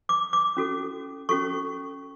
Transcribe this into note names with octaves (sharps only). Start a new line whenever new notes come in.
D6
D6
C#4 F#4 A4
C#4 F#4 A4 C#6